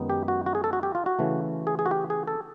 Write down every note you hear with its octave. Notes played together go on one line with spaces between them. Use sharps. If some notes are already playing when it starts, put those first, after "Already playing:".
Already playing: F#2 D#3 G#3 B3 D#4
G4
F#4
F#4
G#4
A4
F#4
G4
F4
F#4
C#3 E3 A3
G#4
G#4
F#4
G4
G#4
A4